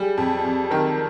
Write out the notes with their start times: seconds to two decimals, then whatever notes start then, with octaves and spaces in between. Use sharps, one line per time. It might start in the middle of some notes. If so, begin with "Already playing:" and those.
Already playing: G3 G#4
0.17 F2
0.45 F2
0.71 D#3 A#4